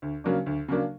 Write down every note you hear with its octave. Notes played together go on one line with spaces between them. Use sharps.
D2
C#3 F#3 A#3 D4
D2
C#3 F#3 A#3 D4